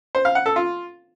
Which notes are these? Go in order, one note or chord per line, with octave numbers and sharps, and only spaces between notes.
C5
F5
F#5
A4
F4